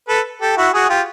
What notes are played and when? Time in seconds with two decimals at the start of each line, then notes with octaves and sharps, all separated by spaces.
0.08 A4 B4
0.42 G4 A4
0.57 E4 F#4
0.74 F#4 G#4
0.90 F4 G4